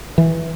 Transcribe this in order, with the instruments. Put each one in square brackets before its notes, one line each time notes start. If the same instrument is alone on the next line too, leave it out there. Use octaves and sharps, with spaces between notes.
[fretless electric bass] E3